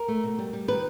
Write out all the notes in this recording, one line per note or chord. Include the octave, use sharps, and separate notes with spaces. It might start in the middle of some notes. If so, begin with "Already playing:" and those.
Already playing: A#4
A3
B2
G3
G3
D#3 B4